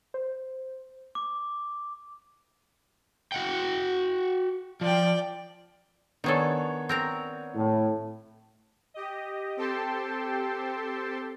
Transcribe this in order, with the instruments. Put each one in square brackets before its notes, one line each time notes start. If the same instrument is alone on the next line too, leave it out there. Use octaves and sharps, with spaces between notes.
[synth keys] C5
[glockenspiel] D6
[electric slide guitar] F#4 F#5 G5
[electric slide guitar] F3 [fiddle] D5 G5
[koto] D#3 G#4 A4 [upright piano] B3 D4 C#5
[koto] C4 A#4 A#5
[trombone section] A2
[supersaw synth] G4 D#5
C4 G4 A4 G5 A5 C6